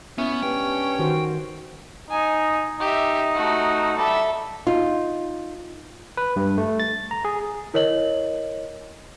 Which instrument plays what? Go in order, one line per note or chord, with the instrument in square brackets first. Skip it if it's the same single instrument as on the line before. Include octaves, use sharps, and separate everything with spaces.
[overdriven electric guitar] B3 [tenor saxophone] C#4 [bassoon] E4
[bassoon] G2 [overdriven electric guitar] G5
[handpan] D#3 F#4 C5
[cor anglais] D#4 [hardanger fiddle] G#5
[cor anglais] D#4 [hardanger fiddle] G4 E5
[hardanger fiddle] A3 F#4
[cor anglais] G3 [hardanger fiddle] A4 E5
[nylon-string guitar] D#4 F4
[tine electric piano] B4
G2
A3
A6
A#5
G#4
[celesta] E4 A#4 C#5 D#5 F#7